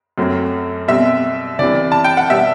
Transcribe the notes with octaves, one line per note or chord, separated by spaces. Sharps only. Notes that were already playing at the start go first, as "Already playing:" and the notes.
F#2 F#3 A3 C4
B2 G3 C4 E5
C2 C3 E3 D5
A5
G5
F#5
B2 G3 B3 E5